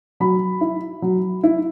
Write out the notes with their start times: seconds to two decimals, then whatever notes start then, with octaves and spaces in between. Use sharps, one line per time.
0.20 F#3 B5
0.61 E4
1.02 F#3
1.43 E4